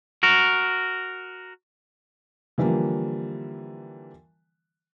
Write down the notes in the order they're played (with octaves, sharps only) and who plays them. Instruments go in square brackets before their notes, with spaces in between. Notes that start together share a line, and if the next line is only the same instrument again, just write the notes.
[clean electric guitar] F#4 A#4
[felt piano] D3 E3 F3 G3 A#3